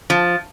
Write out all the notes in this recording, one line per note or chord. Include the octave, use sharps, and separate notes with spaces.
F3